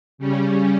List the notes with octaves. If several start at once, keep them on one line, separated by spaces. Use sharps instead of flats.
C#3 G3 C#4